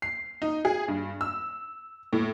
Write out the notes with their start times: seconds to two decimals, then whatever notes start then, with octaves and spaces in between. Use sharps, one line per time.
0.02 C7
0.42 D#4
0.65 G#4
0.88 G2
1.21 E6
2.13 A2